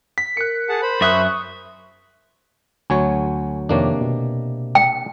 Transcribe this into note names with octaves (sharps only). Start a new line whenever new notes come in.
B6
A#4 F#6 C#7
G#4 F#5 A5
C5 B5
F#2 E5 C#6 D#6 F#6
D2 F#3 C#5 G#5
F2 C3 D#3 A#3 D4 C#5
B2
G5